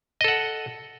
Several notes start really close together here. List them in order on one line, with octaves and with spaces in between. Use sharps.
D#5 A4 F#5